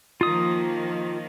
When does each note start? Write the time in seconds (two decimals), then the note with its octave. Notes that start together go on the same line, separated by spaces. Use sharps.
0.21 D#3 F3 A#3 F4 D#6